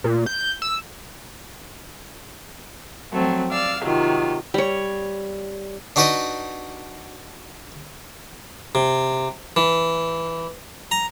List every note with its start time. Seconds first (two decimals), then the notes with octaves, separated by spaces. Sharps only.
0.04 A#2
0.26 G6
0.62 E6
3.12 F3 F#3 A3 C4
3.51 D5 F5 E6
3.83 C3 D#3 F#3 F4
4.54 G3 C#5
5.96 D4 D#4 F#4 B4 D5 D#5
8.75 C3
9.56 E3
10.91 A#5